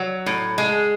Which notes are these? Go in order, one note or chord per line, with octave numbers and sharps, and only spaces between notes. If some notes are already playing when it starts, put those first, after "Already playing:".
Already playing: F#3
A2
G#3